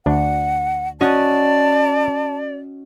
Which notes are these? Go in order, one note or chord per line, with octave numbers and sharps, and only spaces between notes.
D2 D4 F#5
C#4 F#4 D5 D#5 A5